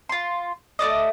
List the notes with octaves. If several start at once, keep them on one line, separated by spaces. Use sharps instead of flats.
F4 C6
A3 F#4 D5 D#5